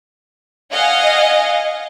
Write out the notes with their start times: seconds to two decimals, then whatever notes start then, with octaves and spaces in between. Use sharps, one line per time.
0.72 D#5 F5 F#5 G#5